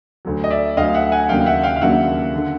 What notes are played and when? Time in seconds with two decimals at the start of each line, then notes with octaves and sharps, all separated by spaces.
0.25 D2 D3 F#3
0.44 D#5
0.50 D5 E5
0.77 D2 D3 F#3 D#5 F5
0.94 E5 F#5
1.12 F#5 G#5
1.29 D#2 C#3 F#3 A#3 D4 F5 G5
1.40 G5
1.46 E5 F#5
1.63 F5 G5
1.76 F5
1.81 D#2 C#3 F#3 A#3 D4 E5 F#5
2.36 D3